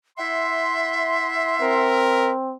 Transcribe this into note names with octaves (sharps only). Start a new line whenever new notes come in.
E4 E5 F#5 C6
C4 A#4